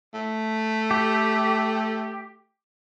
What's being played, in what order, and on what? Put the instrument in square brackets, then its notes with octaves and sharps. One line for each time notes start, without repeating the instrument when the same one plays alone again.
[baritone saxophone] A3
[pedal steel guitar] G4